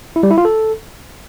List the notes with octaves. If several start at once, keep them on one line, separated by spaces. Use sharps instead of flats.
E4
G3
E4
F4
A4